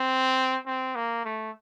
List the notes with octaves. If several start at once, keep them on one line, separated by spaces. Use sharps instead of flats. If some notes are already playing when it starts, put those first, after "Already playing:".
Already playing: C4
C4
A#3
A3